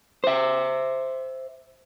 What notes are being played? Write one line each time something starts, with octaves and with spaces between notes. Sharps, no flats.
C5 E5